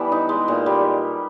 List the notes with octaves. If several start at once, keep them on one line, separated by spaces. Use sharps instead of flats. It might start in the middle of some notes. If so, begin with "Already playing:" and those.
Already playing: E3 G3 B3 A4
D#4
G#3
A#2
G3